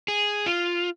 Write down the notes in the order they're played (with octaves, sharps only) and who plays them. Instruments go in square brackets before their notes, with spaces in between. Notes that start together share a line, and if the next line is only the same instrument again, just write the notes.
[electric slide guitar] G#4
F4